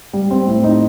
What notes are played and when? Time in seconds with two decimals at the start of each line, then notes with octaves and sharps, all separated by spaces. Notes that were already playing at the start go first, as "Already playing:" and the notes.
0.13 G3
0.31 C4
0.47 A2
0.64 D#4